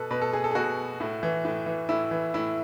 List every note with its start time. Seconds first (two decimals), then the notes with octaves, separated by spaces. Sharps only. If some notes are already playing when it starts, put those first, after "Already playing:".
Already playing: B2 A4 B4
0.11 B2 B4
0.22 A4
0.33 G#4
0.44 A4
0.51 G#4
0.55 B2 F#4
1.00 A2
1.23 E3
1.45 A2
1.66 E3
1.89 A2 E4
2.11 E3
2.34 A2 E4